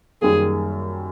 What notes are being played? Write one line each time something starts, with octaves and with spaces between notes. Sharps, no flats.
F#2 D#3 G3 A#3 G#4